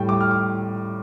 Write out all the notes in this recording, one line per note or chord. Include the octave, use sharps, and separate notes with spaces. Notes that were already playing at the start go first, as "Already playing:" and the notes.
Already playing: A2 G3 G5
D6
F6
D6